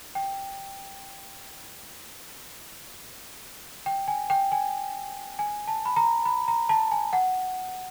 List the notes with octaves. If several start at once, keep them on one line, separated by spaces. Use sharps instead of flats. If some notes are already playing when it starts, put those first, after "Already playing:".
G5
G5
G#5
G5
G#5
G#5
A5
B5
A#5
B5
A#5
A5
G#5
F#5